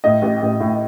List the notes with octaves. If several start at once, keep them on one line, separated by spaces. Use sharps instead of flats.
A2 D#5
A1
A1
A2